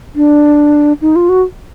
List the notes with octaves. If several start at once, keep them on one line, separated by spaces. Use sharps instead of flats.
D4
D#4
F4
F#4